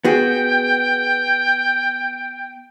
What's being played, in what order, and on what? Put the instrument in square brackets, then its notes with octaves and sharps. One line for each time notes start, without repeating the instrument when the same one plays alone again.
[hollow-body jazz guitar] B3 F#4 G#4 [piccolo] G5